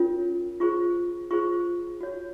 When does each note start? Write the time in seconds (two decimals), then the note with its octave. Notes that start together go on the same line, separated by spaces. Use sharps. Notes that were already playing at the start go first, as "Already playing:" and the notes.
Already playing: C#4 F4 A#4 C#5
0.60 F4 G#4 C5 C#6
1.31 F4 G#4 C5 C#6
2.01 F#4 C#5